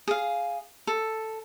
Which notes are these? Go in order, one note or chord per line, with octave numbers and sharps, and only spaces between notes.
G#4 F5
A4